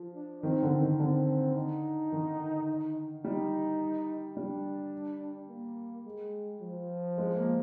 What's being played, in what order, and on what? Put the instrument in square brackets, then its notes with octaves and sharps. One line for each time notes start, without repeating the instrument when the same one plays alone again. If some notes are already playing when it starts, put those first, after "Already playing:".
Already playing: [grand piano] F3
[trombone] D4
[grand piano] D#3 [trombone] C4
[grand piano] D3
D#3
[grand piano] D3 [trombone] C4
[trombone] D#4
[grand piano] D#3
[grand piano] G3 [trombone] D#4
[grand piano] G3 [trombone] D4
[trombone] A#3
G#3
F3
[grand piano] G#3
A#3